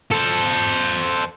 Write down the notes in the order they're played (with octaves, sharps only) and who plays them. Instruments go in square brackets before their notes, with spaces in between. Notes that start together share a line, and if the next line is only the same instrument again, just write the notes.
[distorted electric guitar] A4 C5